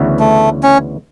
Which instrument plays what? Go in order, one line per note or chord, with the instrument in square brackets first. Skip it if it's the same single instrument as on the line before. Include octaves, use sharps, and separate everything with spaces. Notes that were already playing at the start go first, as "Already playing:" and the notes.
Already playing: [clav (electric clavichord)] D2 C#3 E3 B3
[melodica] A3
C#4